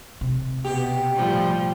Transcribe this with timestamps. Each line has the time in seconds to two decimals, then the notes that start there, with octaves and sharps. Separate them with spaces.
0.21 C3
0.65 B2 G4
1.15 A2 F3 G3